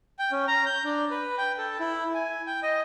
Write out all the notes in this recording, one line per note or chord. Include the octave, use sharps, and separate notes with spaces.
G5
C#4
A#5
G6
D4
B4
G5
A4
E4
G#5
G5
D#5